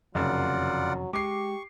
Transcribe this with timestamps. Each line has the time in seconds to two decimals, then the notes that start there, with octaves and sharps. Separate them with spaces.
0.15 F#1 F2 C3 D#3 F#3 F4 D5 F#5
1.13 G#3 G4 C#6 D6 C7